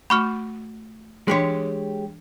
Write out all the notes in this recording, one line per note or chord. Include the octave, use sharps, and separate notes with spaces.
A3 F#4 B5 C#6 F6
E3 G#3 D4 G4 C#5